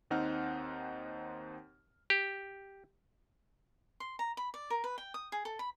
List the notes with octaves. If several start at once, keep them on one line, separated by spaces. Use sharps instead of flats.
D#2 C4 D#4 F#5 F6
G4
C6
A#5
B5
D5
A#4
B4
G5
D#6
G#4
A4
B5